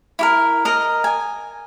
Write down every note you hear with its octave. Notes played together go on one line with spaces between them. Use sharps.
E4 G4 A#4
A#4 D#5
G#5